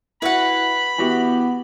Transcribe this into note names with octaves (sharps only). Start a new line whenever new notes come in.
E4 F#4 B4 F#5 B5
E3 B3 F#4 G4